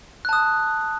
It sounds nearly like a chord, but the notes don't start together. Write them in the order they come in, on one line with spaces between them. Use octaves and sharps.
F#6 A5 D#6